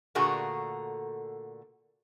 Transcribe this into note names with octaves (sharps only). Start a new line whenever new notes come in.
A#2 D3 A3 F#4 G#4 A#4